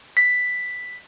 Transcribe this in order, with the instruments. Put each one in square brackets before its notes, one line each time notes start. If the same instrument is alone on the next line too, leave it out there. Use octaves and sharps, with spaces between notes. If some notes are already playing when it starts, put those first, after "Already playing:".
[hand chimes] B6